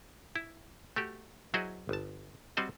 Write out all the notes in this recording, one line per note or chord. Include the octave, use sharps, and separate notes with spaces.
E4
A3 F#4 G4
F#3 E4 F#4 G#4 C5 D#5
G1 A5
G3 C4 F#4 C5 D#5